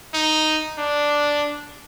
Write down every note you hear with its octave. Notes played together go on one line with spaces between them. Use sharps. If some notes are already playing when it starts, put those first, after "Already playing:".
D#4
D4